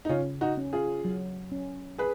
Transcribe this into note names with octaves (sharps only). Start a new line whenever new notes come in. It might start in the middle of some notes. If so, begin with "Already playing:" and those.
D#4
C#3 C#4 F4
D#4 F#4
C#4
F4 G#4
F#3
C#4
G#4 B4